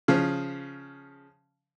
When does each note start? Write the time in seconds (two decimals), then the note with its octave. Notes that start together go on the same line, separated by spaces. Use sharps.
0.08 C#3 F3